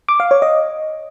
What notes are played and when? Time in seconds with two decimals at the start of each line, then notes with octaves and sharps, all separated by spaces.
0.09 D6
0.20 F5
0.31 C#5
0.42 D#5